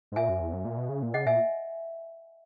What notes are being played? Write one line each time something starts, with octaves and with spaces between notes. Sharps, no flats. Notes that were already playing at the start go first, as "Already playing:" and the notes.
G#2
A#2 E5 G#5
F#2
E2
F#2
A#2
B2
C#3
A#2
C#3 D#5 F#5
A#2 E5 G#5